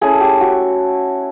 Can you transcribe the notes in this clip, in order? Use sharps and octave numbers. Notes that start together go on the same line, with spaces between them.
A3 C#4 E4 G#4
G4
F#4